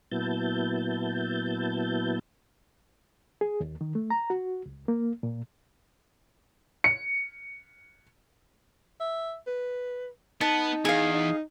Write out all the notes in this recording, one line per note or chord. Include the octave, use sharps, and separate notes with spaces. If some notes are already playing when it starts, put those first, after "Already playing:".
A#2 F#3 B3 E4 A5 G6
G#4
D#2
D#3
A3
A#5
F#4
C#2
A#3
A#2
C#7
E5
B4
B3 D#4 B4 A5
E2 G#4 F5
D#4